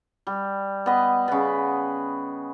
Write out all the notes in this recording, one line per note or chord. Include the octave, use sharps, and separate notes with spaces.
G3
B3 D#5
C#3 B3